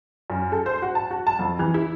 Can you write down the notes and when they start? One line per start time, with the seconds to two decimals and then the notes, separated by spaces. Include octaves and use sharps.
0.30 F#2
0.52 A4
0.66 C5
0.82 F#4
0.95 A5
1.11 F#4
1.27 A5
1.39 F2
1.59 E3
1.74 E4